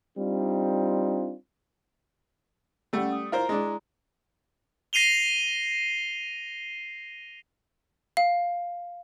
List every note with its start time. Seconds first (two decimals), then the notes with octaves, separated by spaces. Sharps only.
0.17 G3 C4 D4 D#4 F4
2.93 G3 A3 C#4 F#5 E6
3.12 D#6
3.32 E4 F4 A#4 C5 A#5
3.49 G#3 D4
4.93 A#6 C7 D#7 F7 G7
8.17 F5